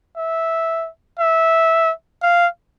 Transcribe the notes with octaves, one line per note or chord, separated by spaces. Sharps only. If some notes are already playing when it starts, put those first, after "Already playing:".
E5
E5
F5